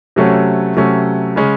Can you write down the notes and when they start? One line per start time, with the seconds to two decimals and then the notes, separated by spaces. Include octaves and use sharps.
0.16 C3 F#3 A3 C#4
0.76 C3 F#3 A3 C#4
1.36 C#3 G#3 C#4